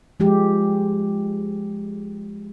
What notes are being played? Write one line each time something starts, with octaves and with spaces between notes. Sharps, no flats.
F3 G#3 G4